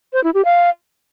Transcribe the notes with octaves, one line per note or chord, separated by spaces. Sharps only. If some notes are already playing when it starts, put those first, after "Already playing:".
C5
E4
G4
F5